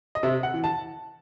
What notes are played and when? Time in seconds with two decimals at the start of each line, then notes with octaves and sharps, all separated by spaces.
0.15 D#5
0.23 C3 E5
0.43 F#5
0.54 E3
0.64 A5